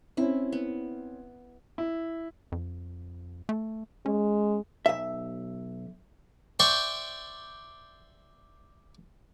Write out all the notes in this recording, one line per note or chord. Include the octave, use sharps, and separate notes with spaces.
C4 C#4 E4
B3
E4
F2
A3
G#3 C#4
B1 E5
C5 D5 E5 G5 C6 C#6